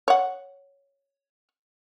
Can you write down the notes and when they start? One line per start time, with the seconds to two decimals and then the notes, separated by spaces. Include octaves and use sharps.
0.08 C#5 F#5